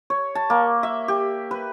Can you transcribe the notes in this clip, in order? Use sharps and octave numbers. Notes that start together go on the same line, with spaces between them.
C#5
A5
A#3
E5
G4
B4